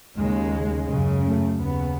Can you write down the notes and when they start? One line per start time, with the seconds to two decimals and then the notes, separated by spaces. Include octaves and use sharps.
0.17 D#2 C#3 G#3
0.89 F#2 C#3
1.24 A3
1.59 D#2 C#3 B3